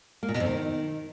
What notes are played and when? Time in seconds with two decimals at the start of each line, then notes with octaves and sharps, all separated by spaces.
0.23 A#3
0.29 A#2
0.34 B2
0.40 F2
0.46 D#3